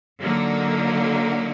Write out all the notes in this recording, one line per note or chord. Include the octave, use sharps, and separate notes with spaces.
D3 F#3 A#3 D#4